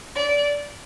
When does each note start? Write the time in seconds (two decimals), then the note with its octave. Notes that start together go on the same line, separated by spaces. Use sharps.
0.15 D5